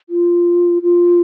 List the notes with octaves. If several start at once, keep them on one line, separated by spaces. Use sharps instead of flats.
F4
F4